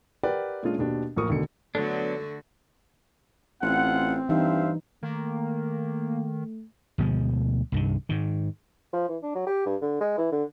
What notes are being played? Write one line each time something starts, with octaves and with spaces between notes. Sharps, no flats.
G4 A#4 B4 D5 F#5 G5
A#2 G#3 C#4 D4 F4
D#2 B2 D4 G4
A1 D#2 F3 A#4 C#6 D#6
E1 D3 D#3 A3 C#7
D3 F#3 A3 B3 D4 F#4 A4
A1 C4 F4 F#5
G2 E3 D#4 C5 E5 F5
D#3 A3 A#3
D2 B2 F3 G#3
C2 G2 D#3
G#2 D#3
F3
E3
D4
F#3
G4
G2
D3
G#3
E3
D3